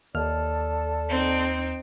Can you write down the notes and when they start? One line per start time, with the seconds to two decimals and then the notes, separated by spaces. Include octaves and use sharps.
0.15 D#2 A4 D5 A5 F6
1.09 C4 D#4